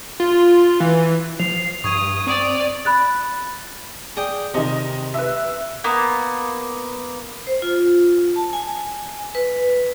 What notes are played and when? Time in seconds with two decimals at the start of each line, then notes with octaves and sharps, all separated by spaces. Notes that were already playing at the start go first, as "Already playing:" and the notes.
0.20 F4
0.80 E3
1.40 F3 C7 F7
1.84 G2 C#6 D#6 G#6 D#7
2.27 C4 D5
2.85 B5 F#6 A6
4.17 G#4 D5 G5
4.54 C3 D#3 D#5
5.14 B4 E5
5.84 A#3 B3
7.47 C5
7.62 F4
8.36 A5
8.53 G#5
9.35 B4